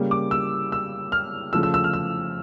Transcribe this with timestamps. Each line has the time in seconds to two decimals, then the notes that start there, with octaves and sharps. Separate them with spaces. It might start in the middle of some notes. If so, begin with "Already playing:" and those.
Already playing: C#3 G3 A#3
0.11 D6
0.31 E6
0.72 E6
1.12 F6
1.53 C#3 F3 A3 E6
1.63 E6
1.74 E6
1.84 F6
1.93 E6